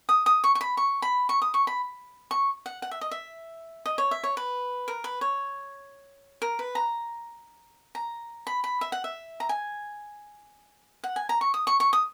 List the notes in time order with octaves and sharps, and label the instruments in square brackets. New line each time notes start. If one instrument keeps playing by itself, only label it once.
[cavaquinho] D#6
D#6
C#6
C#6
B5
C#6
B5
C#6
D#6
C#6
B5
C#6
F#5
F#5
E5
D#5
E5
D#5
C#5
E5
C#5
B4
A#4
B4
C#5
A#4
B4
A#5
A#5
B5
B5
E5
F#5
E5
A#5
G#5
F#5
G#5
A#5
C#6
D#6
C#6
C#6
D#6